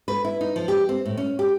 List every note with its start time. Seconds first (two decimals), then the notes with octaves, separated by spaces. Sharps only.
0.08 B4
0.25 E4
0.41 D#4
0.56 F3
0.68 G4
0.89 C4
1.06 A2
1.17 C#4
1.39 G4